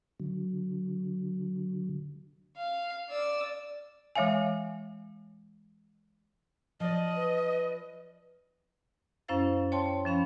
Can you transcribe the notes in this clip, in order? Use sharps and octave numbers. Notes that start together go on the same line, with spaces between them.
D3 F#3
F5
D5 E6
E3 G#3 C#5 E5 F5 G#5
F3 D5 D#5
B4
F#2 C#4 E4 C5 F5 A6
C#5 G5 A5 C6
F3 C#4 F5 B5